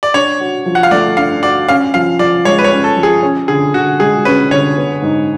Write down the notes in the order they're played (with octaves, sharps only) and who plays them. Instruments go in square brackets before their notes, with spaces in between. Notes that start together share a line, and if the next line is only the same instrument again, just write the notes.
[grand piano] D5
[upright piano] D4 [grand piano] C#5
[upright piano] F#4
F3
[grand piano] F#5
F5
[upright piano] A3 [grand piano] D5
[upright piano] D4 [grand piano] F5
[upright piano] F#4 [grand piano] D5
[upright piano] C#4 [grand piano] F5
[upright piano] F3 [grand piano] F5
[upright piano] F3 [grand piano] D5
[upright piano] G#3 [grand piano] C#5
[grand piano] B4
C#5
[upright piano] C#4
[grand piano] A4
[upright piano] F3
[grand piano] G#4
[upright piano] C#4
[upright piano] D3 [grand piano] G#4
[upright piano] D3 [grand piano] F#4
[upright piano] G#3 [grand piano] G#4
[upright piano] C#4 [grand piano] B4
[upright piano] D3 [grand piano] C#5
[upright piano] B3
G#2